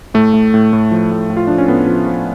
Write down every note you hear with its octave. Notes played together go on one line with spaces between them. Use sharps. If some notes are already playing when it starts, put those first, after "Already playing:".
A2 A3
A2
A2
A2
F3
A2
A2
F4
F3 D4
C#4
A2 B3
F3
F3